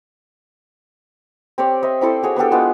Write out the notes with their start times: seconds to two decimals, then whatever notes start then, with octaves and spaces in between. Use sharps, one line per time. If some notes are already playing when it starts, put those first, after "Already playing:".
1.58 C4 G4 C#5 D5
1.83 C5 D#5 E5
2.01 C4 E4 A4 D5
2.23 F#4 G#4 C#5
2.36 B3 D4 G4 A4
2.51 G#3 B3 F4